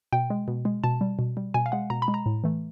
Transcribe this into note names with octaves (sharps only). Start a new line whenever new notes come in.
B2 G5
G#3
B2
G#3
B2 A5
G3
B2
G3
B2 G#5
F5
G#3 F#5
B2 A#5
B5
G#3
A#5
A2
E3 A3